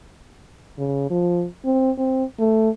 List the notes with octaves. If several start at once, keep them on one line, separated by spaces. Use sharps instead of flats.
C#3
F3
C4
C4
A3